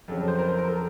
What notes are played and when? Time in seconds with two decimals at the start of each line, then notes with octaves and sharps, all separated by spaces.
0.08 F2 C#3 F#3 A4
0.28 C5
0.39 A#4
0.49 C5
0.58 A#4
0.68 A4